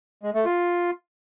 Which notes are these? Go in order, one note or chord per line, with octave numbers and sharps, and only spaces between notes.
G#3
A3
F4